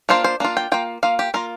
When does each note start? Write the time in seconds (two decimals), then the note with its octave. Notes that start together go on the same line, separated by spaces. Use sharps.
0.09 A#3 D4 F4 C5
0.24 C5
0.40 A#3 D4 F4
0.57 G5
0.72 A#3 F4 G5
1.03 A#3 F4 F5
1.19 G4
1.34 A#3 F4 A#4